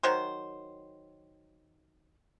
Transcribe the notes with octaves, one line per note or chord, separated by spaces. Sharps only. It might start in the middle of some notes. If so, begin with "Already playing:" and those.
D#3 F#3 C5